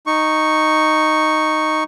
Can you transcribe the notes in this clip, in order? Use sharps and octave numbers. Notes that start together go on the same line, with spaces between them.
D#4 C#6